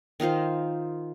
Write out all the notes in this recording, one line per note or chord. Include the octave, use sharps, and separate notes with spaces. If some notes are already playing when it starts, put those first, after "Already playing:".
D#3 D#4 F4 C5